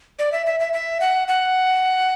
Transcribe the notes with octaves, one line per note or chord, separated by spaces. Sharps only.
D5
E5
E5
E5
E5
F#5
F#5